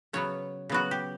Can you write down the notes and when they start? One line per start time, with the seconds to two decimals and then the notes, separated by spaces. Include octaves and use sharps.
0.13 C#3 F#3 B3 C#5
0.69 C#3 F#3 B3 F#4
0.91 G4